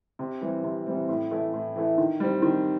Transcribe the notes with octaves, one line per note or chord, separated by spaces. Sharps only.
C3
E3 G3 C4
C3
E3 G3 C4
A2
E3 A3 E4
A2
E3 A3 E4
D#3
G3 C4
D#3